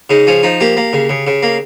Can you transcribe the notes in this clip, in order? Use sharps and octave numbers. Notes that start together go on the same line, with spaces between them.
C#3 D#4
F3 C#4
F3 D#4
A#3 G4
A#3
C#3
C#3
C#3
A#3